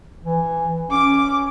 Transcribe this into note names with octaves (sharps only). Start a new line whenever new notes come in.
E3
C#4 D6